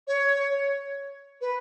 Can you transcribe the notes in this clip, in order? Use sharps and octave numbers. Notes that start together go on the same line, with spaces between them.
C#5
B4